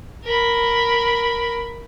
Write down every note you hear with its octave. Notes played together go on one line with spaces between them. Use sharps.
A#4 B5